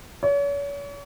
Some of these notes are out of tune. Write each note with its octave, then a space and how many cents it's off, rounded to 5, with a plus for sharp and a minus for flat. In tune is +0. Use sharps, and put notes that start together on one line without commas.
C#5 +40